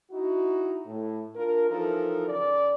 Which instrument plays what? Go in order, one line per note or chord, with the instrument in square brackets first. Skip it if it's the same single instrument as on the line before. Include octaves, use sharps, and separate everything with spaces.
[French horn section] D#4 E4 F#4
A2
D4 F4 A#4
E3 F3 D#4 A4 A#4
C#3 A#4 D5